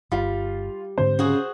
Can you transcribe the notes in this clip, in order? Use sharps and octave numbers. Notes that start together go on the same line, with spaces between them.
G1 G3 F4 F5
G#2 D3 C4 C5
C#3 F#4 G#4